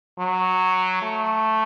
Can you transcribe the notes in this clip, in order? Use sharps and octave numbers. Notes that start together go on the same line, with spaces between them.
F#3
A3